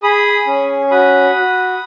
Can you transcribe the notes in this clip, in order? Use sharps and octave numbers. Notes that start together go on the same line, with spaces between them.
G#4 B5 D#6
C#4
F#4 B5 D#6
F#4